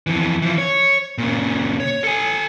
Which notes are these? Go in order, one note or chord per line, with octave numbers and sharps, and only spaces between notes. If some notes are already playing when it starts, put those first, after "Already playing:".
F2 E3
E3 F3
C#5
A#2 C#3
C#5
A4 G#5